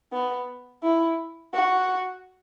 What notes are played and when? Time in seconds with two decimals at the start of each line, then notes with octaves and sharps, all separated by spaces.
0.13 B3
0.83 E4
1.54 F#4